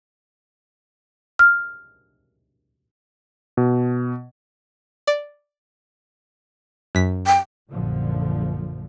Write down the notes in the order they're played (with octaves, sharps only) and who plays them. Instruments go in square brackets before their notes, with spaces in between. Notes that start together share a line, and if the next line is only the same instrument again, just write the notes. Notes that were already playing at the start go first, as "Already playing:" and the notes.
[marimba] F6
[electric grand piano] B2
[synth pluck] D5
F#2 B6
[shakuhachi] G5
[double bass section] A#1 F#2 A#2 D3 F3